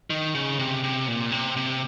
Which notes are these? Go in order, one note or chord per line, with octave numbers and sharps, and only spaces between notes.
D#3
C#3
C3
C3
A#2
C3
C3